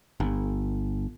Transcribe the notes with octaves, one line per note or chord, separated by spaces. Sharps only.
G1